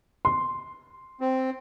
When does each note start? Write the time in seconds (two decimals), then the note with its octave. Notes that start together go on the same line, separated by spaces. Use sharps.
0.25 C6
1.21 C4